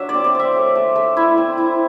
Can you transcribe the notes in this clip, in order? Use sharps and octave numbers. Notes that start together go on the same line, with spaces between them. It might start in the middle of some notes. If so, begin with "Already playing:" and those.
Already playing: F#3 D4 E5
C4 D5
D5
C4 E5
A3
A3
A3
E4
C4
E4